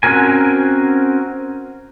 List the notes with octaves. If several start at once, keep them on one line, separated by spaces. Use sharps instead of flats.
C4 C#4 F#4 A#4 G#5